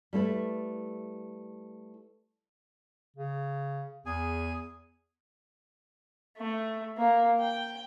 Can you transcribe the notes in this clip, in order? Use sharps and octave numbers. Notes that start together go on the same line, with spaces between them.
G3 A3 E4 B4
C#3
E2 G#4 G#5
A3
A#3
G5